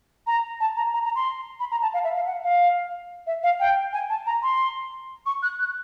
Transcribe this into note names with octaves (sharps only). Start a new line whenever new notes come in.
A#5
A5
A#5
A#5
A#5
C6
B5
A#5
A5
F5
E5
F5
F#5
F5
E5
F5
G5
G#5
A5
A#5
C6
C#6
F#6
F#6